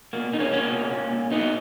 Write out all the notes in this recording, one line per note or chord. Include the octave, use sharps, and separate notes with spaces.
B2 A#3
B2 D#4
A#3 C#4
B2 A#3 C#4
B2
A#2
A#2
A#2 B3 D#4